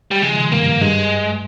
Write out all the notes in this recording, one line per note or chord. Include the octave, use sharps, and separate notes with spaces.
G3
C#3 F3 G#3
C3 D#3
G2 A#3
G2
G#2
G2 G#3